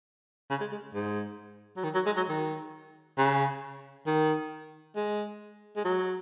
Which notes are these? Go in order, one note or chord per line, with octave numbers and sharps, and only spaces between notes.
C#3
G#3
G#3
G#2
F#3
D#3
F#3
G#3
F#3
D#3
C#3
D#3
G#3
G#3
F#3